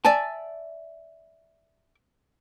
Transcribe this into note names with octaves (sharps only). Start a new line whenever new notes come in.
D5 E5 G#5 A5